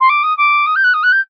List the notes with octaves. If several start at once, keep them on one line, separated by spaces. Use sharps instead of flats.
C6
D6
D#6
D6
D#6
G6
F#6
D#6
F#6
G6